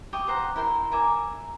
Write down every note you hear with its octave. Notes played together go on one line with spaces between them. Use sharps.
G4 C#6 D#6
G4 C5 F#5 A#5
E4 A#4 G5 C6
A#4 E5 G#5 D6